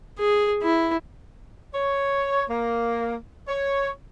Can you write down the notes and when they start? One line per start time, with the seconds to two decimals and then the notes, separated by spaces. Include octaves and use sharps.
0.19 G#4
0.63 E4
1.74 C#5
2.50 A#3
3.48 C#5